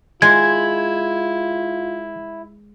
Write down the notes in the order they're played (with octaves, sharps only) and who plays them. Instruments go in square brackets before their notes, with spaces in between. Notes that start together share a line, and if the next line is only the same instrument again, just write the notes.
[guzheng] G#3 [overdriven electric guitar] E4 [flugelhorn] F4 [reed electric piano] G#6